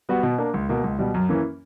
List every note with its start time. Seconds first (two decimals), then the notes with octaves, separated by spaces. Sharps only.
0.09 G3 B3 F#4
0.23 B2
0.38 A#3 D4
0.54 C#2
0.69 B2 A#3
0.84 C#2
0.99 B2 G3
1.14 F#2
1.29 E3 A#3 C#4